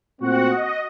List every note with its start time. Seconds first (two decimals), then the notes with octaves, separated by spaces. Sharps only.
0.20 A#2 A3 C4 F#4 F#5
0.50 D#5